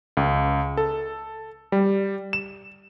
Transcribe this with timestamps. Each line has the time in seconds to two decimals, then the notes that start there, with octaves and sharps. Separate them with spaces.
0.17 C#2
0.77 A4
1.72 G3
2.33 E7